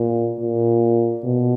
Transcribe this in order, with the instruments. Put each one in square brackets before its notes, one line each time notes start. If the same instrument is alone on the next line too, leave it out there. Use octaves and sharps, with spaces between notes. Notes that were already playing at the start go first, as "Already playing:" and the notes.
Already playing: [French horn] A#2
A#2
B2